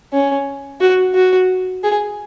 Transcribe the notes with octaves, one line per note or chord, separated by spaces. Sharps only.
C#4
F#4
F#4
G#4